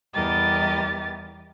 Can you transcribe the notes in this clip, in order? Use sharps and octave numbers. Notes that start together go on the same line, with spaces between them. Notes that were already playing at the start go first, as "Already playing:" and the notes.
E2 G3 G4 A#4 D#5 A6